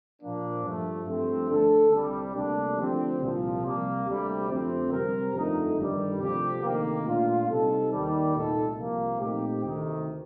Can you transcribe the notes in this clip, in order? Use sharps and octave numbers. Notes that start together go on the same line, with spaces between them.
A#2 F3 A#3 D4
G2 F3 A3
G2 F3 A3 C4
D3 A3 D4 A4
C2 C3 G3
D2 C3 G3 A#3 D4
D3 F3 A3 C4 G4
C2 A#2 F3
C3 G3 A#3
D2 C3 G3
F2 D3 A3 C4
C3 G3 C4 G4 A#4
G1 F2 D3 A3 D#4
G1 G2 D#3 G3
D2 C3 F3 C4 G4
D2 C3 D#3 A#3
A#2 A3 D4 F4
C3 G3 C4 D#4 A4
D#2 D#3 G3
C2 A#2 A3 D#4 A4
C2 C3 F3 A#3
A#2 A3 C4 D#4 G4
D2 C3 D#3